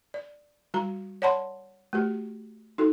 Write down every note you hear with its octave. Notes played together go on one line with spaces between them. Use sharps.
D5
G3 F#4 A#5
C#5 D5 F#5 A5 B5 C6
A3 F#4 G4
D#4 F#4 A4